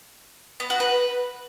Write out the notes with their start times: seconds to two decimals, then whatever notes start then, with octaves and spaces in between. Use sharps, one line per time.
0.60 B3
0.70 F#4
0.80 B4